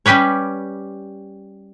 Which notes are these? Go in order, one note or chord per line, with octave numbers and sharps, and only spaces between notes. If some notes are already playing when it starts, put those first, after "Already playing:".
G3 C#4 G4 B4 C#5